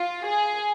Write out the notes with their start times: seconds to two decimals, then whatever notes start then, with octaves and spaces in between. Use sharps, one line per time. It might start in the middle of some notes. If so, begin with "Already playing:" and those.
Already playing: F4
0.25 G#4